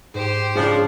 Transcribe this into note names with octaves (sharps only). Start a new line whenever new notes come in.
G#2 G4 C5
C#3 F3 D4 G#4 C#5 F#6